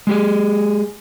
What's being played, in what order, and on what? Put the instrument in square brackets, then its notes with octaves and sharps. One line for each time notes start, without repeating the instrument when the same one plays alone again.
[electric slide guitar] G#3 G4 G#4